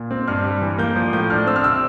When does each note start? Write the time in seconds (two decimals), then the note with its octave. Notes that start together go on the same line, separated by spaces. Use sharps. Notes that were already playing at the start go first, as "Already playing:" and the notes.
Already playing: A#2
0.11 C4
0.28 G2 F6
0.44 G3
0.62 E3
0.78 A#3 G6
0.96 F3
1.13 A2 G6
1.30 D4 F6
1.47 C4 E6
1.56 F6
1.64 C3 E6